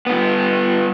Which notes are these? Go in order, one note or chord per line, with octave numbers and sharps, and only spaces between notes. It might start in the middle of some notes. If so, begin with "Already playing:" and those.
G2 B3